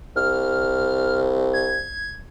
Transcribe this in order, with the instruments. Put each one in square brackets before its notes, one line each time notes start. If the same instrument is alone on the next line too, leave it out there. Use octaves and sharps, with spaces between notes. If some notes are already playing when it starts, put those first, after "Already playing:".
[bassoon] C2 [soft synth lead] F6
[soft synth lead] G#6